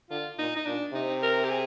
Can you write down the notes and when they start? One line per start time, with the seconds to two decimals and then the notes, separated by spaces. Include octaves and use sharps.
0.10 D3 F4
0.39 A#2 D#4
0.56 D#4
0.66 A#2 D4
0.94 C3 D#4
1.22 A#4
1.45 G4
1.50 G#4